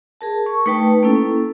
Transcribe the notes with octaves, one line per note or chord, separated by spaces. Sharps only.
G#4 A#4 A5
C#6
A3 D#4 B4 G5 A5
A#3 C#4 E4 A4